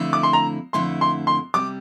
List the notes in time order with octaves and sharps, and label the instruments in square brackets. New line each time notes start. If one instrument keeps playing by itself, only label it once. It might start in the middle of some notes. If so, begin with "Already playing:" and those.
Already playing: [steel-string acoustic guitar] F2 D3 A3 E4
[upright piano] D6
C6
A#5
[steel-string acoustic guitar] F2 D3 A3 E4 [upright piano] C6
[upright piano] C6
C6
[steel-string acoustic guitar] C3 G3 [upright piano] D6